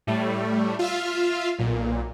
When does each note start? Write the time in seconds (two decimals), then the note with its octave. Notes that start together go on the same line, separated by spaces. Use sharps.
0.07 A2 G3 A3
0.79 F4 E5 F5
1.58 B1 A#2